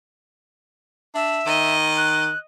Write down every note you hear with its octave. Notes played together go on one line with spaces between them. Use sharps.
D4 E5
D#3 D#5
F#6